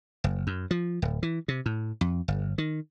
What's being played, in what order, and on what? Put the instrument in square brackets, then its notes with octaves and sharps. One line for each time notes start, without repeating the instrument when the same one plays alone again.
[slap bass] F#1
F#2
F3
D1
E3
C3
A2
F2
G1
D#3